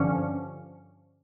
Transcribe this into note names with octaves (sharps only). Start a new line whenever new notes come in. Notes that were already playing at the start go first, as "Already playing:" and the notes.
Already playing: G2 D3 F3 C#4